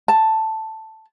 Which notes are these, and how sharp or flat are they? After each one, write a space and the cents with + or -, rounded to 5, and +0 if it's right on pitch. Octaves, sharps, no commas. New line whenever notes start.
A5 +5